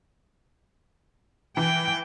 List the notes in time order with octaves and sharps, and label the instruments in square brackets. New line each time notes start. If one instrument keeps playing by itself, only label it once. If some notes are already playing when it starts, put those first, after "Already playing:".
[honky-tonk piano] E3 [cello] G5